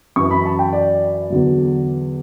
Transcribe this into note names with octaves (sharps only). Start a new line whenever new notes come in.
F#2 E3 C#6
B5
A5
G5
D5
E2 D3 F#3